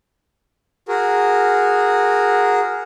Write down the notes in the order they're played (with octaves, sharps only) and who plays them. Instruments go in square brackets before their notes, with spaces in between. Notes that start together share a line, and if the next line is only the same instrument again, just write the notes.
[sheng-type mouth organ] F#4 G#4 A#4